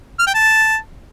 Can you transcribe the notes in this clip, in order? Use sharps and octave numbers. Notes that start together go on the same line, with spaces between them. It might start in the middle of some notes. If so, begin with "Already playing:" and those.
F6
G5
A5